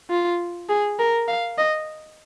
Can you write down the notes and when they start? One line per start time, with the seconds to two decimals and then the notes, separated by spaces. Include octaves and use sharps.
0.10 F4
0.69 G#4
0.99 A#4
1.28 F5
1.58 D#5